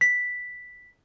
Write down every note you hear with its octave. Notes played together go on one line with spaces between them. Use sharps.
B6